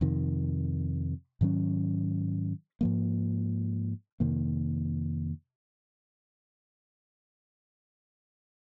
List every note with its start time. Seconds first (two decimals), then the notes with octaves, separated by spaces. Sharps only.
0.01 F2 C3 D#3
1.41 G#2 D#3 F#3 C#4
2.81 G#2 F3 A#3
4.20 F2 C3 D#3 A#3